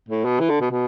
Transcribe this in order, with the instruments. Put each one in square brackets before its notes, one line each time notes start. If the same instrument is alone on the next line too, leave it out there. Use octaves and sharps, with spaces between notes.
[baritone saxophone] A2
B2
E3
D3
B2
B2